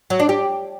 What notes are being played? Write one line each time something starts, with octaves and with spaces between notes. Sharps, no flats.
F#3
D4
G4